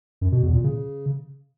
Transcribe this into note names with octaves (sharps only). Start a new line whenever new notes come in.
F#2
B2
E2
A#2
C#3